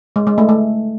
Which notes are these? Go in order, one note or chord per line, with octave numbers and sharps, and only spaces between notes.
G#3
G#3
A3
A3